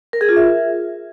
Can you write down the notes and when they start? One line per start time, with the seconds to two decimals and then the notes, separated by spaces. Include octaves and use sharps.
0.13 A#4
0.21 G#4
0.29 F4
0.36 E5